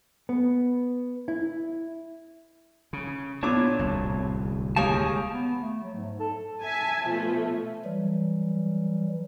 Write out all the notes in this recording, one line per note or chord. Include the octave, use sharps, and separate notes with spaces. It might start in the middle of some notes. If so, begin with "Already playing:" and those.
B3
E4
C#3
A#2 B3 D4 C#5 A5 D6
D1 C2
D#2 G#3 G4 G#4 C#5 F5 A5
B3
A3
F#3
G#2
A4
E5 G#5 A5
B2 F3 A3
E3 F#3 G3